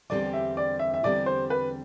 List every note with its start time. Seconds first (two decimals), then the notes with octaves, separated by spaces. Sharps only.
0.10 E2 D3 G3 C4 G4 D5
0.33 E5
0.57 D5
0.79 E5
0.94 E5
1.03 E2 D3 G3 C4 G4 D5
1.26 C5
1.50 B4